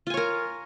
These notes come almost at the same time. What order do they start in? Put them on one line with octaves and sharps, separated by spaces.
F4 G#5 C#5 A#4